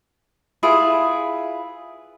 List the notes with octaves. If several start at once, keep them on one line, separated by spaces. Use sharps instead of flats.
E4 F4 G#4 B4